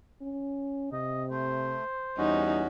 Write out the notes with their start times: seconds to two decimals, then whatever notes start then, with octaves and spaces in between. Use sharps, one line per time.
0.22 C#4
0.92 C3 D#5
1.31 A3 C5
2.18 E2 G3 C#4 D#4 F#4